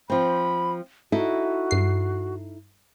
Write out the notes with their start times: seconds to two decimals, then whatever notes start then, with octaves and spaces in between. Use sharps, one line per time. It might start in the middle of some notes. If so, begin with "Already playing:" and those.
0.10 F3 C4 B5
1.12 D#4 E4 F#4 A4
1.71 G2 C7